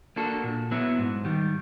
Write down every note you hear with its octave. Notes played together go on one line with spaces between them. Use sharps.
A#3 D4 F#4 A4
A#2
F#3 B3 E4
G#2
D#3 G3